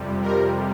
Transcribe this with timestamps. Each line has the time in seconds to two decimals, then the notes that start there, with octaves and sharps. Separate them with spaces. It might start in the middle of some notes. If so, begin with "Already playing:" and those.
Already playing: F2 C3 G3
0.22 A#4